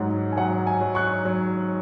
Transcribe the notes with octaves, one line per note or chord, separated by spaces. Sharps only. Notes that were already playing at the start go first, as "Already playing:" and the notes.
Already playing: G#2 F#3 F#5
G#5
F#3 F#5
G#5
F#3
C#6 F#6
F#3